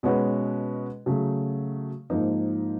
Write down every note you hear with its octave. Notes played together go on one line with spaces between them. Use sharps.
B2 G#3 C#4 F#4 B4
C#3 F#3 A3
G#2 F3 A#3 D#4